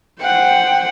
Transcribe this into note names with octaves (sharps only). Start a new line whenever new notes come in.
C5 F#5 G5